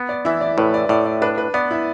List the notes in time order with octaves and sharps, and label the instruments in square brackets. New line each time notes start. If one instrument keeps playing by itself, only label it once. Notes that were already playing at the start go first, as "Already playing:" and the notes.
Already playing: [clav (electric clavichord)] B3
[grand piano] D5
[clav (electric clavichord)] E3 [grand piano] E4 E5
[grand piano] D5
[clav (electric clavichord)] A2 [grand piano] B4
[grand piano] D5
[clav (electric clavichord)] A2 [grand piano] D5
[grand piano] D5
[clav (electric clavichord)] D4 [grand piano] B4
[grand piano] B4
[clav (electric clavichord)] B3 [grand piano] D5
[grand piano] E4 E5